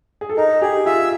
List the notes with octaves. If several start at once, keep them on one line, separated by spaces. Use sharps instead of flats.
G#4
A4
D#4 A#4
G4 G#4
F4 E5